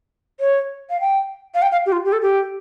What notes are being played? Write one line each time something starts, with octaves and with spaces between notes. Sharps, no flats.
C#5
F5
G5
F5
G5
F5
G4
F4
G4
A4
G4